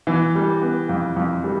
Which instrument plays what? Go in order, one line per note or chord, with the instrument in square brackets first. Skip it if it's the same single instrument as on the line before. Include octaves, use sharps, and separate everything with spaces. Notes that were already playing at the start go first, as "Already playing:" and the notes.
[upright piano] E3 [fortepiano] B3
[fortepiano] G3
B3
F2
F2
G3